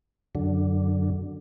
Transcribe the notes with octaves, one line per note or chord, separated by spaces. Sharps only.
F#2 D3